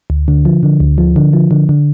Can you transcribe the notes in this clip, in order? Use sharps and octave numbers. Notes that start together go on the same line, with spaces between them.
D2
D3
F3
D3
D2
F3
D3
F3
D3
D3